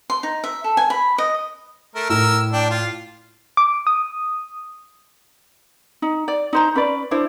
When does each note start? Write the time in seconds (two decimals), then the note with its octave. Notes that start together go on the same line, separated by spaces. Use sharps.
0.10 C6
0.23 D#4
0.44 E5
0.64 A4
0.77 G#5
0.90 B5
1.18 D#5
1.95 A3 A#4
2.10 A2 E4 A#4 E6
2.53 D4 G5
2.70 F4
3.57 D6
3.87 D#6
6.02 D#4
6.28 D5
6.53 D#4 C5 A#5
6.75 C#4 B4 D5
7.11 D4 E4 C5